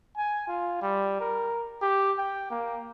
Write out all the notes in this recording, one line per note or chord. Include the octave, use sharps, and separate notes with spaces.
G#5
F4
G3
A#4
G4
G5
A#3